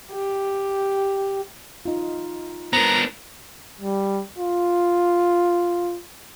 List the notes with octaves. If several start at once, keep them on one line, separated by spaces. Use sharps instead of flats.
G4
D#4 F4
B3 D4 A#4 C5 A#5
G3
F4